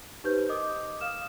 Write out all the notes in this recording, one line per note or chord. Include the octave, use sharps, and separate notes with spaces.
D#4 G4 B4 C5 G6
A#4 D#5 D6 D#6
F5 D#6 F6 E7